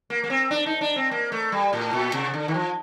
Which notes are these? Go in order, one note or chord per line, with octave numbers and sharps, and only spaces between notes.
A#3
A#3
C4
D4
D#4
D4
C4
A#3
A3
G3
A2
A#2
C3
D3
D#3
F3